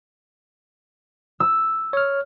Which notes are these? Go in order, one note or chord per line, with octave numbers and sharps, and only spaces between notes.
E6
C#5 F6